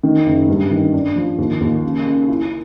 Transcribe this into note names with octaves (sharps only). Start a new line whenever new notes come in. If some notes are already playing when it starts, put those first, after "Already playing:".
D#3
F#1
G2
D#3
D4
F3
D#2
D#2
C#3
C#3
E4